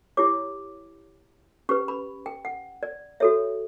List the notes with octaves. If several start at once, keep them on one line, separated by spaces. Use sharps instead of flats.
E4 G4 C#5 D6
C#4 G4 B4 C#6
B5
G5
F#5
D5
F#4 A4 C#5 E5